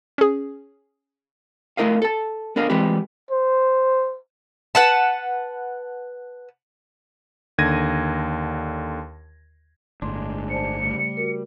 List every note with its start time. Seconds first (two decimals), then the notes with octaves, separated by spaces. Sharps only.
0.18 C#4 G#4
1.77 A3 E4 A#4 D#5 F5
2.02 A4 A5
2.56 B3 D4 A#4 D#5 F5
2.70 E3 G3 G#3 C4 G4 B4
3.31 C5
4.75 B4 F#5 A5
7.58 D#2 D3 G#6 A#6 D#7
10.02 G1 A2 G#3 D4 C6
10.50 C5 D5 A5 C#7
10.82 C#3 G3 A3
11.17 F#4 A#4